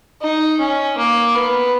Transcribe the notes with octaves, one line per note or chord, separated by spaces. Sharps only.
D#4
C#4
A#3
B3